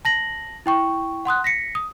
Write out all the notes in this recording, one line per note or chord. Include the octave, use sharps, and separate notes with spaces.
A5 A#6 F#7
E4 G5 C#6
F#5 C6 D#6 F#6
A#6 B6 C#7
D#6